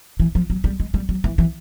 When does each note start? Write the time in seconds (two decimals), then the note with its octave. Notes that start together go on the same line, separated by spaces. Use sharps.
0.20 E3
0.35 F3
0.50 F#3
0.64 G3
0.80 G#3
0.94 G3
1.09 F#3
1.24 E3
1.38 E3